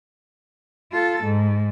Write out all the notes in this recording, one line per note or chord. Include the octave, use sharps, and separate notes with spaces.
F4 A4
G#2